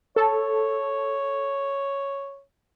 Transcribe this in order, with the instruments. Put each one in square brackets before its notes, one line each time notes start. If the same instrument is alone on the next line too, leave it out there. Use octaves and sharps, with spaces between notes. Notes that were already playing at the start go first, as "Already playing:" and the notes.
[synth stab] A4 [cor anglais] C#5